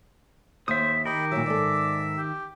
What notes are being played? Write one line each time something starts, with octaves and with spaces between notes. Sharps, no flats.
D#2 C5 E5 D#6
D#3 G4 A#4 D#5 G5 B5
A#2 F#3 E5 E6
G#2 A4 D5
G4